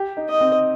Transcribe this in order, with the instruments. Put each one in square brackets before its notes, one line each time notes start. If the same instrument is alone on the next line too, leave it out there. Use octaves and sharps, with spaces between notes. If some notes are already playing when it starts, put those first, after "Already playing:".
Already playing: [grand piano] G4
D#4
[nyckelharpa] D#5
[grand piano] C4